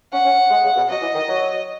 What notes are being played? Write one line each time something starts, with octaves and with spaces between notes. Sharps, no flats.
C#4 F#5
C#4
G#3
C#3
B2
F#3 D#5
E3
D#3
F#3